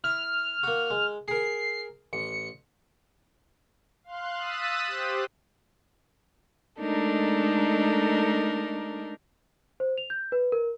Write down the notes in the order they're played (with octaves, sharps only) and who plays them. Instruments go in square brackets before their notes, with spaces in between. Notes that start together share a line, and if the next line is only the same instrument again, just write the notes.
[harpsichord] E4 [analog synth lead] F6
[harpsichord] A#3 F#4
G#3
[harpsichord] G#4 A#4 [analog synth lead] C7
[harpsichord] A1 [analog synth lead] C#7
[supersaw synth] F5 C6 F#6
D#6 E6 F#6 A6 B6 D#7
G4 C5
[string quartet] G#3 A3 D4 D#4 A4 A#4
[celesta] C5
F7
G6
B4
A#4